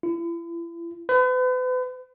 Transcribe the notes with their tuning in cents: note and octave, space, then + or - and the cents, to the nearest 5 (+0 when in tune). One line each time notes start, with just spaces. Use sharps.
E4 +40
B4 +40